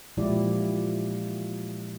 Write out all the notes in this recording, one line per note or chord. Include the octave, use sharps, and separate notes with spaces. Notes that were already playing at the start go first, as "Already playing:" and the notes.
A#2 F3 G#3 E4 G4 D5